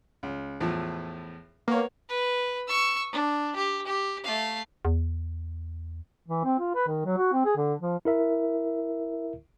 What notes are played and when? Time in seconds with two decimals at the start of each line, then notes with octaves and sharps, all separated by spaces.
0.23 C#2
0.61 E2 A2 F3
1.68 A#3 B3 C#5
2.09 B4
2.67 C#6 E6
3.12 D4
3.56 G4
3.86 G4
4.24 A3 F5
4.85 E2
6.28 E3
6.44 C4
6.59 F4
6.75 B4
6.87 D#3
7.05 F#3
7.17 F#4
7.33 C4
7.45 G#4
7.56 D3
7.80 F3
8.05 E4 A#4 E5